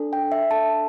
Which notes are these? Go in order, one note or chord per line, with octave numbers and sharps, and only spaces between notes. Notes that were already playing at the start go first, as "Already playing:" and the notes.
Already playing: D4 A4
G5
E5
D4 A4 A5